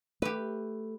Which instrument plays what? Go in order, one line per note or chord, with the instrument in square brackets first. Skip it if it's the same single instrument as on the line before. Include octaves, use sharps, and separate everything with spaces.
[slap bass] A3 [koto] G4 B4